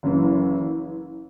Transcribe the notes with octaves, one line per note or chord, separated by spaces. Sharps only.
F#1 F#2 E3